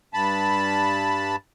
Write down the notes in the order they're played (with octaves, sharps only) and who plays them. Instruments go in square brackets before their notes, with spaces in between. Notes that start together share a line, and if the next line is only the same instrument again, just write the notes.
[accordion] G2 A5 B5